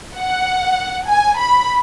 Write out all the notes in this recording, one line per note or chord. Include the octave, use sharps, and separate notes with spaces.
F#5
G#5
B5